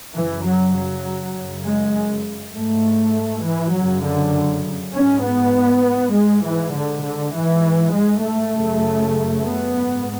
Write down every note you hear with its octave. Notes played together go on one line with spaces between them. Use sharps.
F#2 C#3 E3
F#3
F#3
F#2 C#3
G#3
G#2 A3
E3
F#2 C#3 F#3
D3
G#2 C#4
B3
G#2 G#3
E3
D3
D3
G#2 E3
G#3
A3
F#2 C#3
B3
G#2